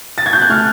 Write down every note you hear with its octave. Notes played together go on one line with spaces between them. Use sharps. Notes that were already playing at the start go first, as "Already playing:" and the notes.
A6
G#6
G6
F#6
A3 F6